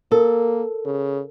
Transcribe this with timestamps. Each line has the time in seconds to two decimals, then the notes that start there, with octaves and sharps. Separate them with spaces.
0.12 A#3 A4 A#4
0.85 C#3